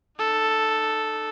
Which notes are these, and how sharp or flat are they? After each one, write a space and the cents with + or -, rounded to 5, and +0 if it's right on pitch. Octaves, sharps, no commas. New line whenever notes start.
D#4 -35 A4 +0